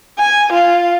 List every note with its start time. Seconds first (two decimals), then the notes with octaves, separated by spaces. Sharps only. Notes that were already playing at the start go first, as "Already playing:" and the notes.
0.19 G#5
0.52 F4